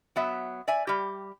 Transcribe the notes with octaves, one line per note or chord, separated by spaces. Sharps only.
F#3 B3 E5
D5 E5 G#5
G3 G4